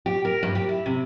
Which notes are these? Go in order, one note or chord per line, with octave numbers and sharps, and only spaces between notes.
G4
A#4
G2
G4
E4
C3